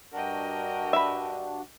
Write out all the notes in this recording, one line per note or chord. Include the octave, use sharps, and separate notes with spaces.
G2 D4 F#4 A#4 D#5 G5
E5 B5